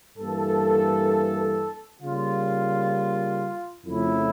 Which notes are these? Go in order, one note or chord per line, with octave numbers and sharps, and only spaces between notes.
G2 E3 A#3 A4
C#3 G3 A#3 F4
F2 C#3 F3 A3 E4